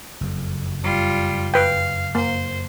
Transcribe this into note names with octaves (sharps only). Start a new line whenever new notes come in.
F#1 F2
G3 F4
B4 F5 G5
A#3 C5